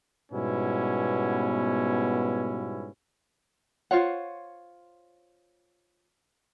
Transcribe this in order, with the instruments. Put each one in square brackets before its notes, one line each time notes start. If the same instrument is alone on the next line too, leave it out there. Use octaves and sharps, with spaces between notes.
[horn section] G#2 B2 G3 B3 C#4 E4
[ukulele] F4 C5 C#5 F#5